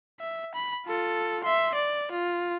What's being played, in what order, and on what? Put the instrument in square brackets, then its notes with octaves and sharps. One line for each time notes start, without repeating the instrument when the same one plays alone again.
[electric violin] E5
B5
F4 A4
E5 C6
D5
F4